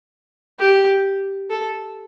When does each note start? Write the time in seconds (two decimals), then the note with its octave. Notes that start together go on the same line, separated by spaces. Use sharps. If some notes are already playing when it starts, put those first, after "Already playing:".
0.59 G4
1.50 A4